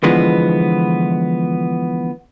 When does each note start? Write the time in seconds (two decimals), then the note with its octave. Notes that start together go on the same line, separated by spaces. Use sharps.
0.03 D3 E3 F3 G#3 B3